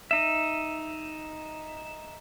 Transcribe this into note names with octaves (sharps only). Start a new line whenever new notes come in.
D#4 E5